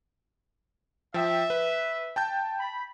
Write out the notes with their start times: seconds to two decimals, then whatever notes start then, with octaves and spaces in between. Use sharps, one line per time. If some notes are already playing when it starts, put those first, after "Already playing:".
1.14 F3 E5 G5
1.50 B4
2.16 G5 A5 G6
2.59 B5